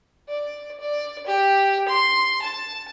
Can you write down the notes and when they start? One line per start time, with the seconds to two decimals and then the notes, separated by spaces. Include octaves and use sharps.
0.28 D5
0.80 D5
1.27 G4
1.88 C6
2.42 A5